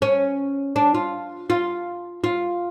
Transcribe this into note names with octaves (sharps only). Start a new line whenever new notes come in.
C#4
D4
F4
F4
F4